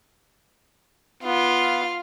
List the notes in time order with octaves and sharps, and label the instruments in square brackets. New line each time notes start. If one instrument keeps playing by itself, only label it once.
[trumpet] B3 [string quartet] F4 F5